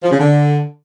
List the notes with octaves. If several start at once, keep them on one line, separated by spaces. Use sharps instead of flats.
F3
C#3
D3